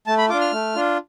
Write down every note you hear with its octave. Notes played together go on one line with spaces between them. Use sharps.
A3 A5
B5
D4 F4 D6
F6
A3
D4 F4